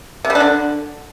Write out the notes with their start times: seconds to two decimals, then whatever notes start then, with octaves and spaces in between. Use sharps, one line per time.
0.25 C3
0.30 G3
0.35 D4
0.40 D3